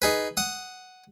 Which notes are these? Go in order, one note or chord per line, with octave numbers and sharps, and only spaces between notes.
D#4 G#4 B4
F#5 D#6